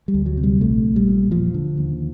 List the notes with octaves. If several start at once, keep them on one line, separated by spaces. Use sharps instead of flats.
G3
D2
F#3
C3
G3
A#1 A3
A#1
G3
A#2
E1 F3
D3
D#2